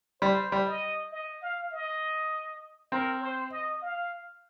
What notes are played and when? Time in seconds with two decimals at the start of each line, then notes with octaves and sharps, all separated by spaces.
0.22 G3 C5
0.52 G3
0.67 D#5
1.12 D#5
1.42 F5
1.72 D#5
2.92 C4 A#4
3.22 C5
3.52 D#5
3.82 F5